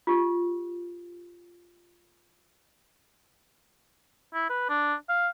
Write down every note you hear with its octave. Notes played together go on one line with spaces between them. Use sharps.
F4 G4
E4
B4
D4
F5